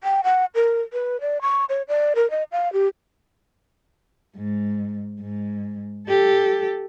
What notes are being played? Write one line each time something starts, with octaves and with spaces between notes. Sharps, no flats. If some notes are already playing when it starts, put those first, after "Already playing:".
G5
F#5
A#4
B4
D5
C#6
C#5
D5
A#4
D#5
F5
G4
G#2
G#2
G4 A4